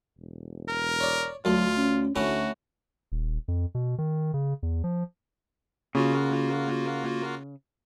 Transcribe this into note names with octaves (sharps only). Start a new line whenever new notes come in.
E1
A#4
C#5 D5
D2 F#3 F4 A4
C#4
D2 A3 C#4 E4 F#4
D#1
F2
B2
D#3
C#3
E2
F3
C#3 A#3 F4 F#4